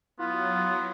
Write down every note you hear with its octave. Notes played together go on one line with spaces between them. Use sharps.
F#3 B3 E4 F4 F6